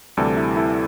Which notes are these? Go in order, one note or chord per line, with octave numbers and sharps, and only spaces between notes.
D2 C3 E3 G3 A4 D5
E4 A4
E4 A4